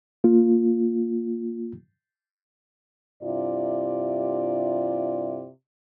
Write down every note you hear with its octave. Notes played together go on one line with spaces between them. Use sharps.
A#3 F4
G2 C3 E4 F4 D5